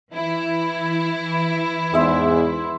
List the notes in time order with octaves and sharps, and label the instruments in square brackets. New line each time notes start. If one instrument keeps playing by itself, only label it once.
[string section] E3 E4
[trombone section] E2 G#2 [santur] C5 E5 E6